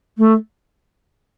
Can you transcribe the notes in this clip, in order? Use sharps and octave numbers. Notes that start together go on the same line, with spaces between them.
A3